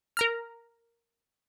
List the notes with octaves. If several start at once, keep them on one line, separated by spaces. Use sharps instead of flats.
A#4 A#5 F6